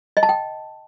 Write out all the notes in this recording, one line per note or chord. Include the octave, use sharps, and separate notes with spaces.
D#5
A5
G5